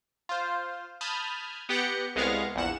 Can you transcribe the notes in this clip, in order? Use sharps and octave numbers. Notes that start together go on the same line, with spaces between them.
F4 C5
A5 B5 D#6 F6 G6 G#6
B3 G4 F#5 G6 A#6 C#7
C2 G#3 B3 F5 C#6 A#6
A#1 E2 F#5 E7